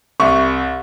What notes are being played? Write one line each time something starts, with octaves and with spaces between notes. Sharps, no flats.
C2 E5 C#6